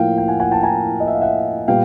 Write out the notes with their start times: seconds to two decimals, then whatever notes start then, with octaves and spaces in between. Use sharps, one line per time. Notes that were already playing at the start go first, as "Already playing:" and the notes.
Already playing: A2 F3 A#3 F5 G5
0.18 G5
0.28 F#5 G#5
0.40 F#5 G#5
0.51 G5 A5
0.63 G#5 A#5
1.00 D#5
1.07 E5
1.14 F5
1.21 E5 F#5
1.68 A#2 G3 B3 F5 G5